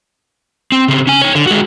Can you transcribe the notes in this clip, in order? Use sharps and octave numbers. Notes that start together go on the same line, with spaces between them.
C4
C#3 C4
C#4 G#5
D#4 C#5
D3
G#3 F#4